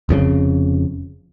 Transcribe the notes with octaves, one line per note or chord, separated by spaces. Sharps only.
F1 F2 G#2 C#3